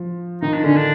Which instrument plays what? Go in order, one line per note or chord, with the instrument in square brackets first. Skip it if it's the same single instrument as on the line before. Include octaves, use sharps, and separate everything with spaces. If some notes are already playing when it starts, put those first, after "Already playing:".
Already playing: [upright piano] F3
[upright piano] D#3 [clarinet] D#4
[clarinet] D4
[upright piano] D3 [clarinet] C#4
[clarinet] D4